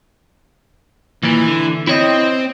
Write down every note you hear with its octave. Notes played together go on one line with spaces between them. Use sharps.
D#2 A#2 E3
D3
C4 E4 C#5 D#5